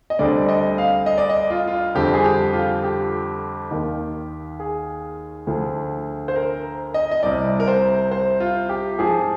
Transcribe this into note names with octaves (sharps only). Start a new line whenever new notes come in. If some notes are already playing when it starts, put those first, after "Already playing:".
D#5
D2 D3 G3 C4 D5
D#5
F5
D#5
D5
D#5
F4
F4
F2 D3 G3 C4 G4
G#4
G4
F4
G4
D#2 D#3 A#3
G#4
D2 D3 F3
C5
A#4
D#5
D#5
C2 C3 G3 D5
A#4
C5
C5
F4
G4
G#2 F3 C4 G#4